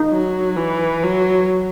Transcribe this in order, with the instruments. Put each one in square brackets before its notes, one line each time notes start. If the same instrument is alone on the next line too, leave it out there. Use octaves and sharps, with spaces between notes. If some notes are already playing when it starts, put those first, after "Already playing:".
Already playing: [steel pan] D#4
[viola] F#3
E3
F#3